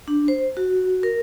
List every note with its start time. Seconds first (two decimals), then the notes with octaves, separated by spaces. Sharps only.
0.08 D4
0.28 C5
0.57 F#4
1.03 A#4